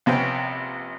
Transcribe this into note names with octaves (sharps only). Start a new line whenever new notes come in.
A#1 C3 B3 C#4 C5 G5